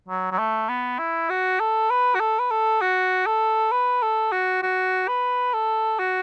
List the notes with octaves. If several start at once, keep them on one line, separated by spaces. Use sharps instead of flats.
F#3
F#3
A3
B3
E4
F#4
A4
B4
F#4
A4
B4
A4
F#4
A4
B4
A4
F#4
F#4
B4
A4
F#4